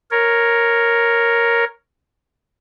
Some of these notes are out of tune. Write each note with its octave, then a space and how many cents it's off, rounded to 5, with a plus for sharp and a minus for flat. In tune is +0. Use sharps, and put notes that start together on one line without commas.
A#4 +0 C#5 +0